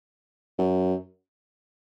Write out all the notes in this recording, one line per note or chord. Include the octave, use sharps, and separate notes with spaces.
F#2